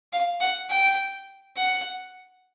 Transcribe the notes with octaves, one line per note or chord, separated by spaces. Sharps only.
F5
F#5
G5
F#5